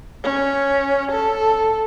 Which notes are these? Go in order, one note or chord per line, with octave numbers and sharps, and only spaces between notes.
C#4
A4